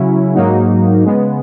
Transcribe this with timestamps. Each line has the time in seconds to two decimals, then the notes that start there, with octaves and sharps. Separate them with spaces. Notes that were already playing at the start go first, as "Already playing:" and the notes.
Already playing: C#3 F#3 C#4 E4
0.35 G#2 F#3 A#3 D#4 F#4
1.04 C#3 G#3 B3